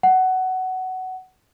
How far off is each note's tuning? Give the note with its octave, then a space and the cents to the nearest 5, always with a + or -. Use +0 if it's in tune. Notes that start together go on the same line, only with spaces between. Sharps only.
F#5 +15